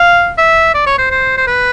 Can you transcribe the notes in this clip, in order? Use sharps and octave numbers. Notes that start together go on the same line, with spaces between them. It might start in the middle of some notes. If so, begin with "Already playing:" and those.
Already playing: F5
E5
D5
C#5
C5
C5
C5
B4